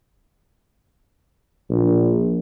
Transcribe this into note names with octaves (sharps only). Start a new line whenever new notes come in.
A#1